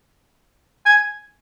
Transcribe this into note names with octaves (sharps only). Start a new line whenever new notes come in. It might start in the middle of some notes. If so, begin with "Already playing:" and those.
G#5